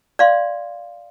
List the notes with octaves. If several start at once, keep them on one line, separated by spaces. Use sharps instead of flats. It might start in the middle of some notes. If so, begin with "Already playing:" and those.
D5 F5 C6